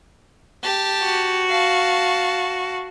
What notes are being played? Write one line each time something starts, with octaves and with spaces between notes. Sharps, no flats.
G4 A5
F#4
F5 A5